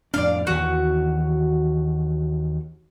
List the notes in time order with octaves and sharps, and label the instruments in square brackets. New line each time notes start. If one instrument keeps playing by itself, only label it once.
[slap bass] F2 A2 D4 [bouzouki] D5 F5
[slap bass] D#2 D#3 E3 [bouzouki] F#4